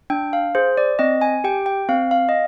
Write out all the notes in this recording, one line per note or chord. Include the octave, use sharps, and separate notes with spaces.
D4 G5
F5
G#4 C5
D5
C4 D#5
G#5
G4 G5
G5
C4 F5
F5
D#5